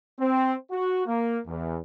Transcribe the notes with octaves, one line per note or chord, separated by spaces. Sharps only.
C4
F#4
A#3
E2